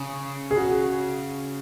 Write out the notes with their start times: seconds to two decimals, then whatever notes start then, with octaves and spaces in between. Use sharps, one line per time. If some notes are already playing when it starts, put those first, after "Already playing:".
Already playing: C#3
0.51 G#4
0.56 F#4